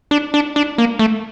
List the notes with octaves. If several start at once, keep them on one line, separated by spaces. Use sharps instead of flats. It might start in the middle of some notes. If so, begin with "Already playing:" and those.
D4
D4
D4
A#3
A3